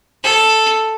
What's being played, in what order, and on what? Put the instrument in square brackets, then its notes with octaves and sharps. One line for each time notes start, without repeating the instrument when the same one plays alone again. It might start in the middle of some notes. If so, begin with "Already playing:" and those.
[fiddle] A4